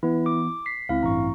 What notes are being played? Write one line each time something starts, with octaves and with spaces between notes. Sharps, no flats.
E3 B3 E4
D6
B6 C7
C#2 C4 E4 F5
A1 G2 A#5 C#6